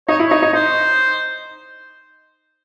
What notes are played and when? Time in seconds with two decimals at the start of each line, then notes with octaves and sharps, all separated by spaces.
0.08 D#4 C#5
0.20 E4
0.27 D#4 C#5
0.42 D#4
0.53 D#4 C5